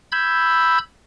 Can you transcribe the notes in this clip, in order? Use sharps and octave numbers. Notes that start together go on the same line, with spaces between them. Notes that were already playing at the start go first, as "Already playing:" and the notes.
B5 E6 G6 G#6